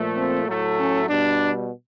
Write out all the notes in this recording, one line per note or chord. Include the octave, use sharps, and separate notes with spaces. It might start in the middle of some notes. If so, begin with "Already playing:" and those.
Already playing: A#2 F3 A3
C4
A2 F#3 A3
C#4
B2 G3 D4